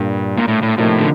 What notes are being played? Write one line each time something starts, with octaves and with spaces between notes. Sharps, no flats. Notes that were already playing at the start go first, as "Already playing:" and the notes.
Already playing: G2 A#2 G3 A#3 D4
A#2
A2
A2
A2 C3 F3 A#3 D#4
D3